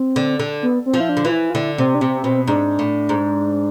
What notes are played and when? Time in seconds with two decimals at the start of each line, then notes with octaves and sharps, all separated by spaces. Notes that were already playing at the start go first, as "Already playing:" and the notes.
Already playing: C4
0.16 D3
0.39 D3
0.63 B3
0.86 C4
0.94 F3
1.00 E4
1.09 D4
1.17 D3
1.25 E3 F4
1.32 E4
1.50 F4
1.55 D3 E4
1.78 C3 C4
1.95 D4
2.01 C3 C4
2.24 B2 C4
2.47 G#2 D4
2.79 A2
3.09 G#2